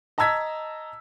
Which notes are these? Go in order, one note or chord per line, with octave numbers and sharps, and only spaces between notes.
D#5 A5 A#5 E6 G#6 B6